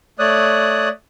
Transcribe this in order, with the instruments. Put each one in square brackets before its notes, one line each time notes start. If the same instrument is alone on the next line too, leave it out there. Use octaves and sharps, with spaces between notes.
[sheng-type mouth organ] A3 C#5 D5 D#6 F#6